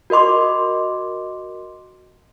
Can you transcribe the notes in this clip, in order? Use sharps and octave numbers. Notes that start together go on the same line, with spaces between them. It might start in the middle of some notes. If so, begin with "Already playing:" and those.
F#4 A#4 D#5 C6 D6